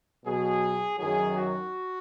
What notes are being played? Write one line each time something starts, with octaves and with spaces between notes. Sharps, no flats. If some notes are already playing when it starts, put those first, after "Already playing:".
B2 F#3 G#4
F#2 D#3 F#3 G#4
F#4